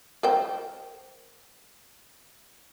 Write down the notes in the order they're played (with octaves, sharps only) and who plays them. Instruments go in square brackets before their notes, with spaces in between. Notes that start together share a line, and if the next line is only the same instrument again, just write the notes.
[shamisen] A#4 C5 G5